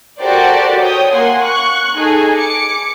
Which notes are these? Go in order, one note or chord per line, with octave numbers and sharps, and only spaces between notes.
F#4 G4 A4 A#4 C5 D5
C#5 G5 D#6
A#3 F#5 G#5 C6
C#6 F#6
D#4 G#4 A4 G#5
D6 C#7